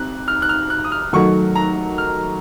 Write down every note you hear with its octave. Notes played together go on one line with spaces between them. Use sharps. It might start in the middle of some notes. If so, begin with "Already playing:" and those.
Already playing: C4 F#6
F6
F#6
F6
F#6
D#6
F6
D#3 F#3 A3 D#4 F#4 C#6
A#5
F6